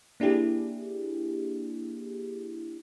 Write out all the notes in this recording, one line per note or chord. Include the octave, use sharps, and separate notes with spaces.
A#3 D4 E4 G4 G#4